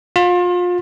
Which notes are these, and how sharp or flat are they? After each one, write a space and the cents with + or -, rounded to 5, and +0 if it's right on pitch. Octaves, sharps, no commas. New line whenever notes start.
F4 +30